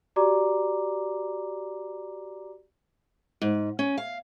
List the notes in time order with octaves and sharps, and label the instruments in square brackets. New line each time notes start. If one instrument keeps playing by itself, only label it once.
[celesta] F#4 G4 D5 A#5 D6
[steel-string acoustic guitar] G#2
C#4
F5